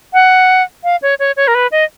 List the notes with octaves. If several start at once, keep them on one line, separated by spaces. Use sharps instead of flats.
F#5
F5
C#5
C#5
C#5
A#4
B4
D#5